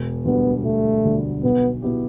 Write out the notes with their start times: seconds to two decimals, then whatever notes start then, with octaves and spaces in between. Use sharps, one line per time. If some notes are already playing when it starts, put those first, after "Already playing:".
Already playing: E1
0.25 D2 D3 G3 B3
0.64 E1 A3
1.04 D2 D3 G3
1.43 B1 B3
1.82 B2 B3 E4 G4